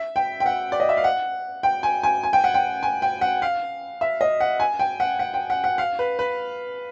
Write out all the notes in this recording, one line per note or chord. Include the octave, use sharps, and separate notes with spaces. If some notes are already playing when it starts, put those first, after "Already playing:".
Already playing: E5
G5
G5
F#5
D5
D#5
E5
F5
F#5
G5
G#5
G#5
G#5
G5
F#5
G5
G#5
G5
F#5
F5
E5
D#5
F#5
G#5
G5
F#5
F#5
G5
F#5
F#5
F5
B4
B4